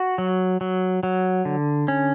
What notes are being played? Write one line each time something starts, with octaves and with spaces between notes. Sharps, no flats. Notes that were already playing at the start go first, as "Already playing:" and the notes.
Already playing: F#4
F#3
F#3
F#3
D3
C#4